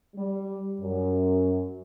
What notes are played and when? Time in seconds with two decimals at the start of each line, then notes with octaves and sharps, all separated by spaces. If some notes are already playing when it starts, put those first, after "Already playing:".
0.16 G3
0.80 F#2